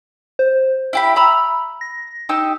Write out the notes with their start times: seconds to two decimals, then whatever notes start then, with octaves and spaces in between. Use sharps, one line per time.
0.39 C5
0.93 E4 G4 E5 B5
1.16 A#5 B5 E6
1.81 A#6
2.29 D#4 G4 E6